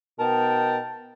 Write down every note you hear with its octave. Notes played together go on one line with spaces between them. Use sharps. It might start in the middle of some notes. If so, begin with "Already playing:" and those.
B2 D#4 A#4 G5 A5